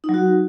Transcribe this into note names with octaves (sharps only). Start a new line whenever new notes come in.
D#4
F#3
F#4